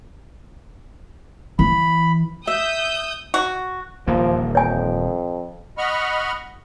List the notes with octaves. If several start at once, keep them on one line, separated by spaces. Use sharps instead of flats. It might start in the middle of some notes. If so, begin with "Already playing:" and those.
E3 B5
E5 D#6 E6 G6
F#4
D#1 E2 F3 A#3
F2 C#5 G#5
D#5 F#5 B5 C#6 F6